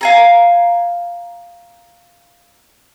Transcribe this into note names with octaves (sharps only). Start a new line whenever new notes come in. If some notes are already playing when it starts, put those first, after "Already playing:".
F5 G#5 A#5